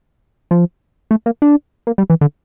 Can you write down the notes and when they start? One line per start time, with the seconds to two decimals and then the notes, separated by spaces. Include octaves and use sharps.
0.51 F3
1.11 A3
1.26 A#3
1.42 D4
1.87 A#3
1.98 G3
2.10 E3
2.21 D3